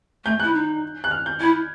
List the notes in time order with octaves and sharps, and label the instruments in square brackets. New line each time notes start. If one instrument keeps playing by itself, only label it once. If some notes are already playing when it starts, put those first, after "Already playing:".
[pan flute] A3 [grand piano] G6
[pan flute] E4 [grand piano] F#6
[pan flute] D#4
[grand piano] F#6
F6
G6
[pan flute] E4 [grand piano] G#6